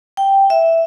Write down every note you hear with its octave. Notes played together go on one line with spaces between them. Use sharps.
G5
E5